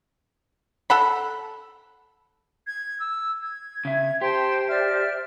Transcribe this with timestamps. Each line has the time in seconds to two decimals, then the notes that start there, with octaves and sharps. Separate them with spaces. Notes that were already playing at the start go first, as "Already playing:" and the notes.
0.90 A4 F#5 B5
2.67 G#6
3.00 E6
3.42 G#6
3.85 C#3 E5
4.21 G4 C5 G5 A5 C6
4.69 D5 E5 F6